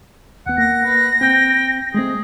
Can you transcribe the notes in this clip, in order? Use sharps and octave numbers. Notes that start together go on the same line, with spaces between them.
D#2 B3 F#5
A#3 A#6
B4
C4 G5 G6
G#3 A3 C4 G#4